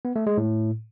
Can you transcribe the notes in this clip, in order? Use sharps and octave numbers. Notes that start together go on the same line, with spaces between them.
B3
A3
G#3
A2